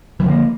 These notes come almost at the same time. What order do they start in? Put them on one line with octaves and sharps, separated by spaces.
E3 F3 D3 A#3